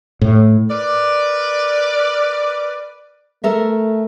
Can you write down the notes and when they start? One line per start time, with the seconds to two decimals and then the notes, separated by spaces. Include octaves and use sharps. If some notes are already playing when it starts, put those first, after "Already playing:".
0.21 A2
0.70 A#4 B4 D5
3.44 A3 A4 A#4 E5